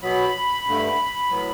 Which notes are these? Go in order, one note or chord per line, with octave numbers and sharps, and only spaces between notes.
B2 F#3 B3 B5
G2 D3 A3
A2 F#3 B3